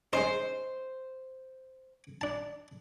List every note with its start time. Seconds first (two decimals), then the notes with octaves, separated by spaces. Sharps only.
0.13 G#3 C#4 D#4 C5
2.21 D4 A5